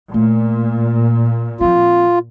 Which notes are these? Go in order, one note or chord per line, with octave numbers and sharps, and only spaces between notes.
A#2 A3
F3 C4 F4